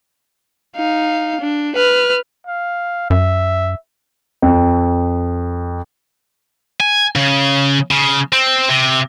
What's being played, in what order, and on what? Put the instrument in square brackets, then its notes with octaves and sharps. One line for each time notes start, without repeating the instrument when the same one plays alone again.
[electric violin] D#4 F5
D4
B4 F6
[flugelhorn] F5
[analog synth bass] F#2 [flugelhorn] E5
[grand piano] F2
[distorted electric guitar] G#5
C#3
C#3
C4
C3